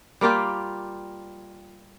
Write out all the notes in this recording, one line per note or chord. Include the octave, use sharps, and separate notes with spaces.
G3 A#3 F4 G4